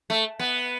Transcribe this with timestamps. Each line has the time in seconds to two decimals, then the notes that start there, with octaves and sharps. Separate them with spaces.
0.10 A3
0.39 B3